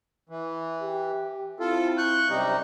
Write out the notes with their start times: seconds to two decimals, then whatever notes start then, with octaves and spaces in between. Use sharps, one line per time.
0.29 E3
0.82 G4
1.60 C4 E4 F4 A4
1.98 C#6 F#6 G6
2.29 F#2 C3 G3 D#4 G4